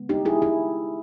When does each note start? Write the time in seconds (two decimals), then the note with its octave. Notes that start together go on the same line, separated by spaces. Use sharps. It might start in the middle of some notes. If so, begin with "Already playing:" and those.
Already playing: C#3 G#3 B3
0.09 D#4 G4
0.25 E4 G#4
0.42 E4 G#4